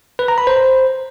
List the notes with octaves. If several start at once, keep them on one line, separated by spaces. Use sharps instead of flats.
B4
A#5
B5
C5